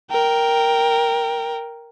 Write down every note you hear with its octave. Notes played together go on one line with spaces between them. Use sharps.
A#4 G5